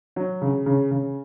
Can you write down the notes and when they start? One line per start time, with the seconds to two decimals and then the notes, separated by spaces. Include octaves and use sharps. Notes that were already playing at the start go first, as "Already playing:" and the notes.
0.16 F#3
0.42 C#3
0.66 C#3
0.91 C#3